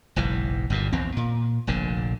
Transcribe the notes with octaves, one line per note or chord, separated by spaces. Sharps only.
F#1 B1 G#2 E3
G1 G2 A#2
A#1 E2 C4
A#2
F1 A#1 A#2 D3